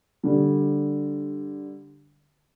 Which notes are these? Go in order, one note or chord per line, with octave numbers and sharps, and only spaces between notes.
D3 G3